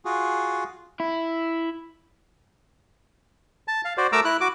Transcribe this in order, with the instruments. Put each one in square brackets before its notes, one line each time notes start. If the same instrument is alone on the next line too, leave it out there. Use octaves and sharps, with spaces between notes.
[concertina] F4 F#4 G#4
[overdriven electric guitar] E4
[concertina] A5
F5
F#4 C5 D5
A3 A#4 A#5 D6 E6
E4 F#6
F#4 D6